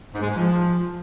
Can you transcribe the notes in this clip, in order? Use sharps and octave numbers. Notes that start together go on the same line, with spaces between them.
G#2
G#3
G#2
F3